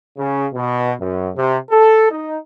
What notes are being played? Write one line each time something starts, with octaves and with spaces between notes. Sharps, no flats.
C#3
B2
F#2
C3
A4
D#4